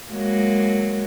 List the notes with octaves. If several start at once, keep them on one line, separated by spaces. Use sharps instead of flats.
F#3 G#3 A#3